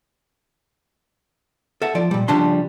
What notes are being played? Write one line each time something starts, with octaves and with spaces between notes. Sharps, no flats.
A4 E5 F#5
F3 D5
A#2 G3
C#3 F3 G3 D4 A5 C6